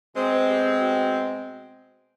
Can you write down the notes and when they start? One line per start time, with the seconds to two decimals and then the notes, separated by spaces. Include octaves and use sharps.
0.15 B2 G#3 C4
0.47 G4
0.79 F#4